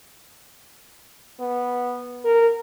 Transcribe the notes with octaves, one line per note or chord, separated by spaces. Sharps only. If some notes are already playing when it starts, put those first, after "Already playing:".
B3
A#4